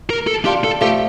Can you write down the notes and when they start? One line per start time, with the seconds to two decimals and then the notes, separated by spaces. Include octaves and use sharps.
0.10 A#4
0.27 A4
0.45 D4 F4 G4
0.64 A4
0.81 F3 A3 G4